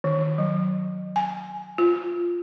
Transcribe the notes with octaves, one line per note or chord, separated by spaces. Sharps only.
D#3
F#3
G#5
F4